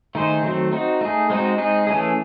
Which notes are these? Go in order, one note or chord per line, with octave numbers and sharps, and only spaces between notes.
D#3 A3 D#4 G#4 C5
D#3 F#3 A3 C4
C4 D#4 F#4
A3 D#4 G#4
G#3 C4 D#4 F#4
G#3 C4 D#4 G#4
E3 A3 C#4 G#4